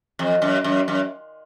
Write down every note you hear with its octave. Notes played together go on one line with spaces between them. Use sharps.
F2
F#2
F#2
F#2